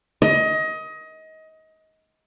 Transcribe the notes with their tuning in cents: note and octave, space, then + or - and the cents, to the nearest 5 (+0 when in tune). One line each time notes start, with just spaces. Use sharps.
D#5 +25